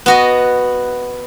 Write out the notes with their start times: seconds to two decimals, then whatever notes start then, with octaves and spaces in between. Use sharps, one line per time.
0.06 B3 F#4 D#5